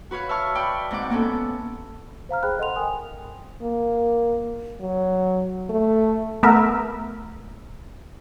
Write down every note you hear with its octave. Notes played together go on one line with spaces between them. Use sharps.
F#4 B4 C#5 F5
E5 F5 A5 C#6 F6
D5 G5 B5 C#6
G#2 C4 F#5 D6
A#3 B3 C#4 A4
C5 F5 A#5 F6
G#4 C5 G5 B5 F#6
A4 D#5 F#5 C6 F7
A#4 G5 G#5 D#6
A#3
F#3
A3
A3 B3 A#4 E5